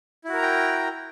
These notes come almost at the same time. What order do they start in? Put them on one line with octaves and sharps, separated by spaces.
E4 F#4 A#4 A#5 G5